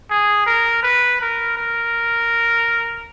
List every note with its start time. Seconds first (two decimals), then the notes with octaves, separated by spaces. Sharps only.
0.10 G#4
0.46 A#4
0.83 B4
1.21 A#4
1.57 A#4